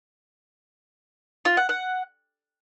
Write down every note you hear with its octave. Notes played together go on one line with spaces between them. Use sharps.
F4
F#5
F#5